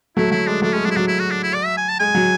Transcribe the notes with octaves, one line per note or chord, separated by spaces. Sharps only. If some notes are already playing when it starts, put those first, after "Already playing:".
F#3 A3 E4
F#3 E4
G#3 D4
F#3 A3 D4
G#3 C#4
F#3 D4
E4
F#3 D4
E4
F#4
D4
E4
D5
E5
G#5
A5
G#3 G#5
F#3